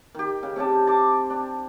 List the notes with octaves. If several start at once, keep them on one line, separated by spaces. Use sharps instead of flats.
D#3 G4
C#3
C3 C#4 G4 A5
A5 C6 D6
D4